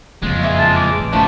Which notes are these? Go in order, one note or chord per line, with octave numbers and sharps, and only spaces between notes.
F#1 F2 A#2 G#3 F4
E3
A5
D6
A1
F#1 A2 F3 A3 B3 C#4 D4